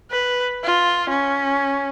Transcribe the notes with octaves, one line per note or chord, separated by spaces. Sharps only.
B4
F4
C#4